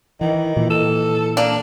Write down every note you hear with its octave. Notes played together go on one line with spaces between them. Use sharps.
D#3 E3
A#2 E3
A4
A#3 D4